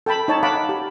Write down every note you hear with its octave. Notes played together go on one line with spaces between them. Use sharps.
A4 G5 A5 B5
D#4 C#5 A5
F5 F#5 A5 B5 D6
G4